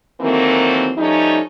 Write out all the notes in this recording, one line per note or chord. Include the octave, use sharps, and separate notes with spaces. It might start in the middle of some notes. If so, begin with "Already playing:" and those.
D#3 E3 F#3 A3 A#3 C4
F3 G3 A3 C#4 D#4